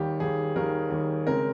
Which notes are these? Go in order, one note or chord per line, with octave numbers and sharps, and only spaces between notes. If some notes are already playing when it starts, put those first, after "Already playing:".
Already playing: D#2 D#3 G3 G4
D#2 D#3 G3 G#4
D#2 D#3 G3 A#4
D#2 D#3 G3
C#3 G#3 C4 A#4